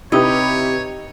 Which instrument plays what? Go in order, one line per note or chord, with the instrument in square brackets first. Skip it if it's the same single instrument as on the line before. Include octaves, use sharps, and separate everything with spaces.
[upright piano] C3 [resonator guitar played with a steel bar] D#4 [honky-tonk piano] E4 G4 B4 [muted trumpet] C#5